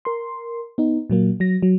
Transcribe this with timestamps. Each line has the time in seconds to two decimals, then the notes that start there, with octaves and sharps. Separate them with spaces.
0.05 A#4 C6
0.78 B3 D#4
1.10 A#2 F#3 A#3
1.40 F#3 A#6
1.63 F#3